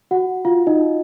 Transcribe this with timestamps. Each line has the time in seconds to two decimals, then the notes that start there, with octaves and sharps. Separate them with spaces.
0.11 F#4 F#5
0.45 F4 F5
0.67 D#4 D#5